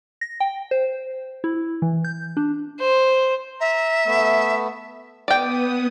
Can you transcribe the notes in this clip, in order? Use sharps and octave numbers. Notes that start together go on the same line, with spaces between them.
A#6
G5
C5
E4
E3
G6
D4
C5
E5 A#5
A3 B3
B3 D5 G5 D#6